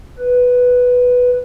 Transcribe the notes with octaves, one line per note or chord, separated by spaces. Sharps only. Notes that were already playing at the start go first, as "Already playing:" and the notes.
B4